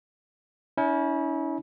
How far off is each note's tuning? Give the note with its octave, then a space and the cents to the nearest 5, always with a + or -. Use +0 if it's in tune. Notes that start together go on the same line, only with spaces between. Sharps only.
C#4 +30 E4 -35